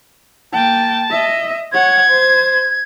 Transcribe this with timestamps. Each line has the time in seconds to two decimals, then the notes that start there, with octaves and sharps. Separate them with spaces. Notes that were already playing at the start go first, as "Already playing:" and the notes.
0.53 A#3 G5 A5
1.10 D#5 E5
1.72 C#5 F#5 G#6
2.09 C5